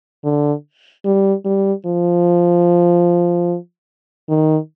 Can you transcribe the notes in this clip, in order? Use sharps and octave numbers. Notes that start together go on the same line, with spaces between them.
D3
G3
G3
F3
D#3